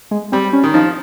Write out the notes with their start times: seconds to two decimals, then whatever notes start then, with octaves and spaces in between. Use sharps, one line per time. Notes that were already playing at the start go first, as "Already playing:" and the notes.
0.11 G#3
0.32 G3 C4
0.53 C#4
0.64 D#3
0.74 F3 D#4